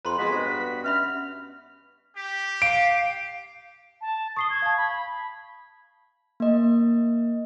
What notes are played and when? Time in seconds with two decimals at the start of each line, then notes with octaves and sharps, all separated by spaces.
0.05 F2 B4 A#5 C6
0.19 G#3 B3 F#4 B4 B6
0.32 G2 C5
0.84 C#4 E5 B5 F6
2.16 G4
2.62 F5 D7
4.01 A5
4.37 C#6 D#6 C7 G7
4.50 G#6
4.62 F5 A5
4.77 B5
6.40 A#3 D#5